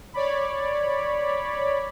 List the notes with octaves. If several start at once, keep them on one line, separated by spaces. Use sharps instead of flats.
C#5 D5 B5